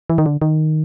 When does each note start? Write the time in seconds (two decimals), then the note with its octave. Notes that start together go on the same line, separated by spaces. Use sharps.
0.10 E3
0.18 D#3
0.26 D3
0.42 D#3